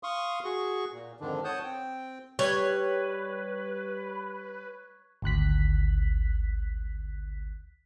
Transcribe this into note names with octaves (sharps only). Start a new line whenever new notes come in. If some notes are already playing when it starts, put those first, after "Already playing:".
F5 C6 C#6 D#6
F#4 G#4 C#6
A#2
F2 G#2 D3 D#3 D4
C#5 F#5 A5 D#6 G6
C4 G5
G3 B4 C#5 C#6 F#6 G#6
G#1 D2 F#6 B6